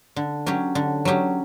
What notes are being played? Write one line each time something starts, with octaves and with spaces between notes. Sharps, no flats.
D3
F#3 C#4 G4
D3
F#3 C#4 G4